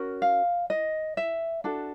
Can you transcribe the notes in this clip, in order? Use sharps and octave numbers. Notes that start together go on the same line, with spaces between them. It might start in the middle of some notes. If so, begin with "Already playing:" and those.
Already playing: C#4 F#4 A#4
F5
D#5
E5
D4 F#4 A4